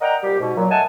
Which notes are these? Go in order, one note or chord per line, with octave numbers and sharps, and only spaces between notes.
A#4 D5 D#5 F#5 G5 A#5
C2 A#2 G3 G4
G#2 B2
A#2 F#3
A3 A#4 D#5 F#5 G#5 A5